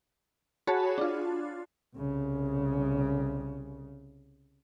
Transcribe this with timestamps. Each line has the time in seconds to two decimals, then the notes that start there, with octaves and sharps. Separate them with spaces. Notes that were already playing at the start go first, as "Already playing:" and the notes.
0.67 F#4 G#4 C#5 A5 B5
0.98 D4 F4
1.96 C2 C#3